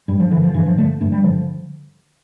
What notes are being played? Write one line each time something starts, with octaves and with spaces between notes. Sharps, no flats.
G2 G3
F3
D3 E3
F3
G2 E3
F3
D3 A3
G2 A3
G3
D3 F3